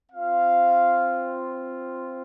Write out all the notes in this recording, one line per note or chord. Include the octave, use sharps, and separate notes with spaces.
C4 F4 F5